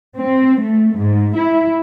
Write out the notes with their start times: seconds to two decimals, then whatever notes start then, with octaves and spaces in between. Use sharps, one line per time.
0.17 C4
0.61 A3
0.97 G#2
1.35 E4